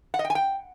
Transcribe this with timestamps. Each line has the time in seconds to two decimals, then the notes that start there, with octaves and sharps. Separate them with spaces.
0.14 F#5
0.19 D#5
0.25 G5
0.30 G#5
0.35 G5